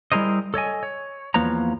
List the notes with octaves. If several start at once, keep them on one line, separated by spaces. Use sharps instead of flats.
G3 E4 G#4 A#4 C5 D#5
A4 C#5 D#5 G#5
C#5
E2 F3 A#3 B4 C#5 A#5